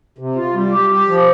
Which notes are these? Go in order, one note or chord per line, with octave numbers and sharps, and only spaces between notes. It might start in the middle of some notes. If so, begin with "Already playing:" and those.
C3
F4
G3
G4
G4
F3